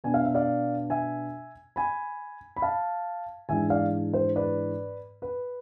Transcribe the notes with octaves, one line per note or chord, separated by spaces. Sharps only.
B2 B3 D4 G#5
F5
E5
D5 F5
E5 G#5
G#5 B5
B5
F5 A5
G#2 E3 G#3 D4 E5 G#5
D5 F5
C5
B4 D5
B4